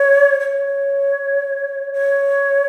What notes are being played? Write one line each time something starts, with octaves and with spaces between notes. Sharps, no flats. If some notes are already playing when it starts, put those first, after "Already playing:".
Already playing: C#5
C#5
C#5